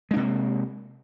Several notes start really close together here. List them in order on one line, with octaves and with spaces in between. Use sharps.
G#3 D4 C3 A#3